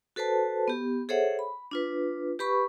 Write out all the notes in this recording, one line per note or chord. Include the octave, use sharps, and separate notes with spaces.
F#4 A4 B4 C5 A5
B3 G4
G#4 A4 C5 C#5 E5 F#5
B5
D4 F4 B4
G4 B4 B5 C#6